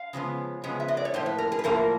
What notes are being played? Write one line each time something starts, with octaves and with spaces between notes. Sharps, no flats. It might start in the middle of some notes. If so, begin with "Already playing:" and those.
Already playing: F5
C#3 F3 G#3 B3
C#3 F3 G#3 B3
E5
D#5
D5
C#5
A2 F3 A#3 C5
B4
A#4
G#4
B4
A2 F3 A#3 A#4